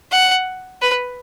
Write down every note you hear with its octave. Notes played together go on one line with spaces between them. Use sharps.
F#5
B4